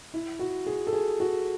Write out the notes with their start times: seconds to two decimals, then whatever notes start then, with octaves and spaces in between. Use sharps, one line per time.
0.14 E4
0.39 F#4
0.66 G#4
0.87 A4
0.93 G#4
1.20 F#4